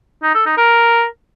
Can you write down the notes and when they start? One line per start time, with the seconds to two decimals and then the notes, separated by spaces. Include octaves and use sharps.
0.23 D#4
0.35 A4
0.46 D#4
0.58 A#4